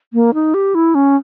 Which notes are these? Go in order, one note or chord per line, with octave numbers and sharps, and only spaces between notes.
A#3
D#4
G4
E4
C#4